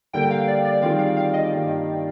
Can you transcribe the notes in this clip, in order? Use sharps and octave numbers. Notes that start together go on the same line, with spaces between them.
D3 G3 A#3 G5
F5
D5
D5
D#3 G3 C4 F4 G#4 F5
F5
F5
D#5
G2 D#3 G3 A#3